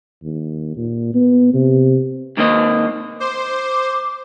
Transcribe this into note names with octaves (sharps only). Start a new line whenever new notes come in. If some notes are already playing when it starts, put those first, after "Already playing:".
D#2
A#2
B3
C3
G#2 D#3 A#3 C4 D#5
C5 D6